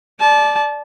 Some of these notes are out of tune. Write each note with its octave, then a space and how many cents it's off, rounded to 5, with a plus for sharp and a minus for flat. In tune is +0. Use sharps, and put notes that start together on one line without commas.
D5 +0 A5 -25